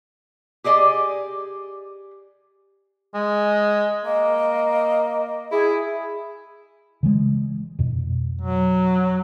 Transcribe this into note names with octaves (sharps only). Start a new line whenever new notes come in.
G4 G#4 D5 D#5 G#5
G#3
A#3 D#5
E4 G#4
C#3 E3 G#3
F2 B2
F#3